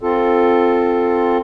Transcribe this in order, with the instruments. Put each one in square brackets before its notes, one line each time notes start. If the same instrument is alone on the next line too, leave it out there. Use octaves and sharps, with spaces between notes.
[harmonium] C4 F4 A4